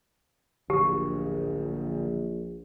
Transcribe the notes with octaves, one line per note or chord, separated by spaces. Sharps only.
A#1 D3 F#3 G4